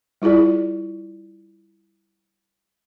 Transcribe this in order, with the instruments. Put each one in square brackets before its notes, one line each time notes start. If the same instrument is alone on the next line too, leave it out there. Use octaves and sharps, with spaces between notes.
[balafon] G3 E4 F4 G#4 D5